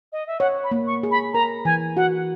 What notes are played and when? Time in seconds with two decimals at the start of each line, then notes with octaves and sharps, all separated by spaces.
0.12 D#5
0.27 E5
0.40 C#5 F#5
0.64 B5
0.71 A#3
0.87 C#6
1.03 G#4
1.11 B5
1.34 A#4 A#5
1.65 E3 G#5
1.97 F#4 F#5